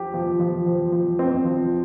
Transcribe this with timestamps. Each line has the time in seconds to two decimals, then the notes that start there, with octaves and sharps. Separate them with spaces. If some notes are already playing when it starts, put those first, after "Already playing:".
Already playing: F3 G4
0.14 F3
0.40 F3
0.66 F3
0.92 F3
1.19 C4
1.45 F3